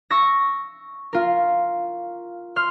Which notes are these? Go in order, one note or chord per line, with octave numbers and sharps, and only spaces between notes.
C#6 E6 A#6
F4 A#4
C6 F6